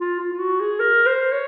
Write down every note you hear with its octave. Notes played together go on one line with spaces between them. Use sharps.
F4
F4
F4
F#4
G#4
A#4
C5
C#5